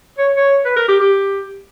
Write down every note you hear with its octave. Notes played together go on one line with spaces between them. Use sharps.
C#5
C#5
B4
A#4
G4
G4